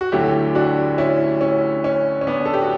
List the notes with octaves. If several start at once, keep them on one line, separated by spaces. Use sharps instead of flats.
F#4
D2 D3 F#3 E4 G4
D4 F#4
C#4 E4
C#4
C#4
C#4
B3 D4
A4
G4
F#4